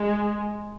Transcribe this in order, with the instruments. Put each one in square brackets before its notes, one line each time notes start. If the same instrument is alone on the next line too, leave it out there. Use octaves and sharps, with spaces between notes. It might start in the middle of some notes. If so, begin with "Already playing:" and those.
Already playing: [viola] G#3